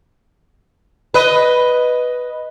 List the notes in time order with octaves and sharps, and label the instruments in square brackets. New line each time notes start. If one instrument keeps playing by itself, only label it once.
[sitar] B4 D#5